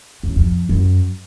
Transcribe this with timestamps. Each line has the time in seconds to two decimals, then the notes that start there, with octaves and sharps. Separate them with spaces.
0.23 F#2
0.36 F2
0.69 F#2